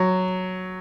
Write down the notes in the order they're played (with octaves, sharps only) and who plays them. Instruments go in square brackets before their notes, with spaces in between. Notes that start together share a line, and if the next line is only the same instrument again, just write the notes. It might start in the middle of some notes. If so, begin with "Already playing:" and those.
Already playing: [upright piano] F#3